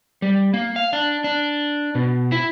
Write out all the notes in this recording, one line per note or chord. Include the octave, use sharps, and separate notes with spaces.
G3
A#3
F5
D4
D4
B2
E4